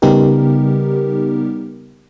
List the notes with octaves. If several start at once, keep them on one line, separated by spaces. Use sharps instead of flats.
C#3 G3 B3 D#4 G4 A#4